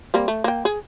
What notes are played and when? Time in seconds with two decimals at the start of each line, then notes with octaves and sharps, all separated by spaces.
0.14 G3 A#3 C4
0.28 A3
0.44 A#3 G5
0.65 G#4